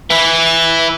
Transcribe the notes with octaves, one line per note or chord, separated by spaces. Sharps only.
E3 E4